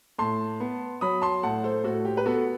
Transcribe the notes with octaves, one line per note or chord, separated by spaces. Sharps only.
A2 A5 C6
B3
F#3 B5 D#6
A5 C6
A2 F#5 A5
A4 C5
A2 F#4 A4
G4
B4
B3 F#4 A4